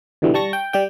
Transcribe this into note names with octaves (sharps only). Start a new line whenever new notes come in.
B2 D3 E3 G3
G3 A5 C#6 A#6
G5
G3 G4 G5